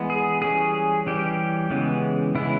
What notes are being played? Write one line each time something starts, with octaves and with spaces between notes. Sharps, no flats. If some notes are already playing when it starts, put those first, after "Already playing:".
Already playing: E3 G#3 B3
G#4
E3 G3 C#4 G#4
E3 G3 C#4 G4
C#3 E3 G#3 B3
C#3 E3 G#3 B3 E4